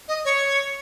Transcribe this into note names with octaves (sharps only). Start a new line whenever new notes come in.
D#5
C#5